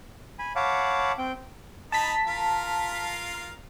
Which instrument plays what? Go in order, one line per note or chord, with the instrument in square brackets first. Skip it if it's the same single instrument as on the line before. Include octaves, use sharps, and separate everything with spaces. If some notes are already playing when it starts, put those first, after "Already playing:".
[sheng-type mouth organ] G#5 B5
C#5 F5 F#5 A5 B5 D6
C4 G5
[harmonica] D#4 B5 [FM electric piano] A5 B6
[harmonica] F4 A#4 F5